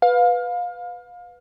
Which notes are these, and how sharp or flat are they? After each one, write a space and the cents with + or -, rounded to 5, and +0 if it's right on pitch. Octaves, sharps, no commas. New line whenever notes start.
B4 +0 F5 +25